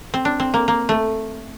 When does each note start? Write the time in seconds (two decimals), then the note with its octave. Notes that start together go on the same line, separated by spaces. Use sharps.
0.14 C4
0.25 D4
0.40 C4
0.54 A#3
0.68 A#3
0.89 A3